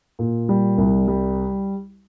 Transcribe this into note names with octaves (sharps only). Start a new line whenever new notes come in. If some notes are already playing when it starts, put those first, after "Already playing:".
A#2
G3
C2
G3